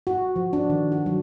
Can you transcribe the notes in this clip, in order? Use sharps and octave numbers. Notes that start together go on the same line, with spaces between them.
F#4
F3
D4
D#3
F#4
F#3